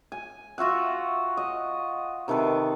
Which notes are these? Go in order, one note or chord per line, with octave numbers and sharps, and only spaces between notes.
G#5
F4 F#4 E5 F#5
D#5
C3 D#3 A4 B4